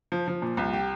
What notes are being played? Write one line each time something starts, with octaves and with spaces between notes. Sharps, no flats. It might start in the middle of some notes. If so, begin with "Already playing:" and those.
F3
F3
A#2
C2
G4